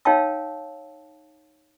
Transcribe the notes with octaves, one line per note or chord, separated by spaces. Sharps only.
D#4 C#5 F5 G5 A5 E6